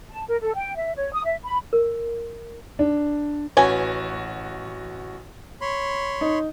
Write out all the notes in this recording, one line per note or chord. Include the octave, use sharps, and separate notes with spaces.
A5
A#4
A4
G5
E5
C#5
D#6
E5
B5
A#4
D4
A1 C#4 F#4 B4 G#5
C#5 B5 C6
D#4